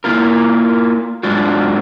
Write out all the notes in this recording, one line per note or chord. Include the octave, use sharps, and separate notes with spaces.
A#3 E4 F4 A#4
G#2 G#3 D4 F4 F#4